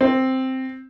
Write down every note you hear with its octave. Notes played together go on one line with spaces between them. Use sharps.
C4